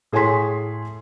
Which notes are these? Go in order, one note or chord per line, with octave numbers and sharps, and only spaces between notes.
A2 G#4 C#5 G#5 C6 B6